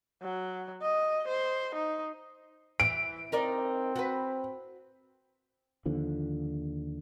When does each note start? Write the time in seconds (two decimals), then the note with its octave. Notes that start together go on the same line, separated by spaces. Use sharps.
0.22 F#3
0.82 D#5
1.28 C5
1.75 D#4
2.80 E3 D7
3.32 C4 D#4 A#4 D5
3.96 F#4 B4
5.86 D#2 D3 F3